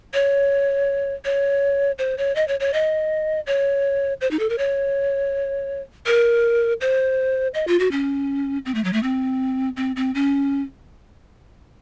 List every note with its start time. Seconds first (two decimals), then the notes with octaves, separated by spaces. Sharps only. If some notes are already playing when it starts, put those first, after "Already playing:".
0.14 C#5
1.25 C#5
1.99 C5
2.18 C#5
2.35 D#5
2.48 C#5
2.60 C#5
2.73 D#5
3.47 C#5
4.21 C5
4.31 D#4
4.39 A4
4.50 A#4
4.58 C#5
6.06 A#4
6.81 C5
7.54 D#5
7.67 F4
7.80 F#4
7.91 C#4
8.66 C4
8.75 A3
8.84 F#3
8.93 A3
9.03 C4
9.77 C4
9.96 C4
10.15 C#4